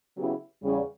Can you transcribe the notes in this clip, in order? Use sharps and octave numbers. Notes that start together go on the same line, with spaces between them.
C#3 F#3 B3 E4 G4
E2 C#3 G3